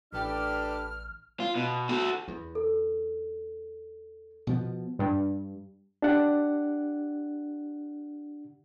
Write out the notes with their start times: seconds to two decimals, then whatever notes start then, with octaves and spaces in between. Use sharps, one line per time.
0.13 A1 D4 G4 A4 B4 F6
1.40 F4
1.55 B2
1.89 F#4 A4
2.28 E2
2.55 A4
4.47 B2 F3 B3
4.99 G2
6.02 D4 G4 F#5